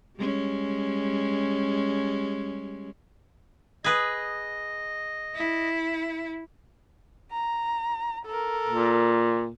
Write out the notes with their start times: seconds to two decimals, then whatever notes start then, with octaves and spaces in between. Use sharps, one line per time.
0.17 G3 G#3 C#4
3.84 G#4 B4 D#5
5.34 E4
7.32 A#5
8.26 A4 A#4
8.68 A#2